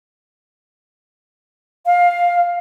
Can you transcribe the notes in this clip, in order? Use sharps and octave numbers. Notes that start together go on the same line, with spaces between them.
F5